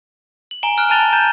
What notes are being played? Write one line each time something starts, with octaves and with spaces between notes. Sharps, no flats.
F#7
G#5 A#5 D7 G7
G#5 F6 F#6
A5 A#5 F#6 A6 F7 G7
A#5 G6 D#7